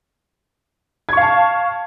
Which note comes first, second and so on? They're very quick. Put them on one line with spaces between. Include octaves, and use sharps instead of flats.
G#6 C#6 F5 A5